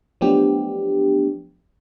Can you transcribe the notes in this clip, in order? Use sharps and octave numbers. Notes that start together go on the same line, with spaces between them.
F3 F#3 A3 B3 D4 G4